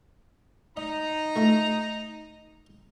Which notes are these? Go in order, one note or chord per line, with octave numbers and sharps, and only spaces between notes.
D#4 D#5 A#5
A3 E4 F4